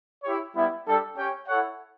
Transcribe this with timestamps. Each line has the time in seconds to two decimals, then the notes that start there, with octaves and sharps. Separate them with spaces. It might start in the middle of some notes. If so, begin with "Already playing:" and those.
0.24 E4 G4 C#5
0.55 G3 B3 E4
0.86 G3 D4 A4
1.17 C#4 G4 C#5 G5
1.48 E4 A4 C#5 F#5